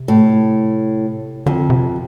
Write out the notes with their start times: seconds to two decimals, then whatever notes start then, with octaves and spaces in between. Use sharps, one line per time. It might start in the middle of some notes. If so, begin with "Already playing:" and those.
Already playing: C3
0.08 A2
1.46 F2 D3
1.70 C3